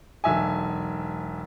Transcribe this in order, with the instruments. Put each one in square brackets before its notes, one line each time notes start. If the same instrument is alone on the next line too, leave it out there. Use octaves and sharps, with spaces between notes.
[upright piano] E1 B1 E5 G#5